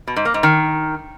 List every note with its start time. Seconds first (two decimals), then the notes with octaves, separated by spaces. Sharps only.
0.07 B2
0.16 G#2
0.25 A#3
0.34 G#2
0.43 D#3